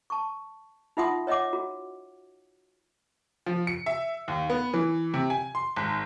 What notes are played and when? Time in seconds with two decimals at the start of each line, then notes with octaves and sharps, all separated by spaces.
0.10 A5 C#6
0.97 D#4 F4 E5 F#5 C6 D#6
1.27 C#5 D#5 E5 F#5 D6
1.53 F#4
3.46 F3
3.67 C#7
3.86 E5
4.28 D#2
4.50 B3
4.74 E3
5.14 C3
5.30 G#5
5.55 C6
5.76 G#1